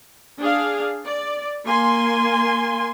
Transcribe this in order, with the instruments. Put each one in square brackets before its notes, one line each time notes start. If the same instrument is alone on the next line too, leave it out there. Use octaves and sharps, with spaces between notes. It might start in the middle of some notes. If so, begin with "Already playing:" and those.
[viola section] D4 G#4 F5
D5
A#3 G#5 C6